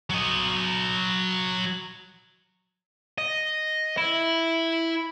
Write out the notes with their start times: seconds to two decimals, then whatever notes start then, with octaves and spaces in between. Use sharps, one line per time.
0.10 F#3 D#5
3.18 D#5
3.97 E4